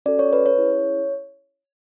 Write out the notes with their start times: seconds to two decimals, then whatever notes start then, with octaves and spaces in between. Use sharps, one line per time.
0.06 C#4 F#4 A4 D5
0.19 C#5
0.33 B4
0.46 C#5
0.57 C#4 E4 G#4